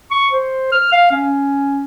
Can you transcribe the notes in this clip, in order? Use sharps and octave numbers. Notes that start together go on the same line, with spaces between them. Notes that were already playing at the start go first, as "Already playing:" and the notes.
C#6
C5
F6
F5
C#4